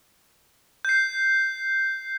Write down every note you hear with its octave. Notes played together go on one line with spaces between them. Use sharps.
G6 C7